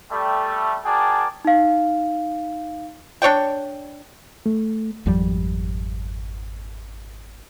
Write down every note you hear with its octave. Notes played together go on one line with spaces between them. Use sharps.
G3 A3
F#4 G#4 A#4 D5 G5 A5
D#4 F5
D4 C#5 D5 G5
A3
G#1 F2 F3 G3